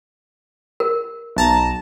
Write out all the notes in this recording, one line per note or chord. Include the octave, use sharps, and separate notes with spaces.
A#4
B1 A5 A#5